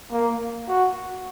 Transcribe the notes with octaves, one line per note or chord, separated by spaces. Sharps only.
A#3
F#4